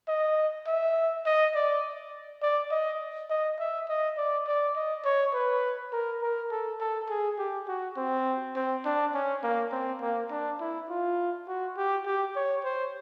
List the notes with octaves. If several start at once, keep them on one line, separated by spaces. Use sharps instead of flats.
D#5
E5
D#5
D5
D5
D#5
D#5
E5
D#5
D5
D5
D#5
C#5
B4
A#4
A#4
A4
A4
G#4
G4
F#4
C4
C4
D4
C#4
A#3
C4
A#3
D4
E4
F4
F#4
G4
G4
C#5
C5